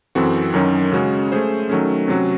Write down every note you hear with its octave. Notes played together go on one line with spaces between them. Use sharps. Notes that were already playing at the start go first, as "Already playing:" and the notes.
F#2 E3 C4 F#4 A4
F#2 D#3 F#3 C#4
C#3 G#3 C#4 F#4
A3 C#4 G#4 C5
D#3 F#3 A3 C#4
C3 F#3 C#4 F#4